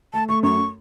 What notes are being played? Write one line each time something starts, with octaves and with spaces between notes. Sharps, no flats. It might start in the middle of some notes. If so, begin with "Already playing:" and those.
A3 A5
A3 C#6
F#2 C#6